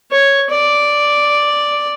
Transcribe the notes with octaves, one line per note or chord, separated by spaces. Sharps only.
C#5
D5